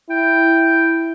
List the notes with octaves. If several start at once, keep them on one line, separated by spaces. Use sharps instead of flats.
E4 G5